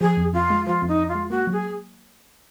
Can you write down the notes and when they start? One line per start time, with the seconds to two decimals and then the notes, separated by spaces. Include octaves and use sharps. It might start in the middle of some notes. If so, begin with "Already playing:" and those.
0.01 F3 G#4
0.17 F2
0.33 F2 F4
0.50 G#3
0.66 F3 F4
0.82 F2
0.88 D#4
0.99 F2
1.08 F4
1.15 G#3
1.30 A#3 F#4
1.47 F#3
1.52 G#4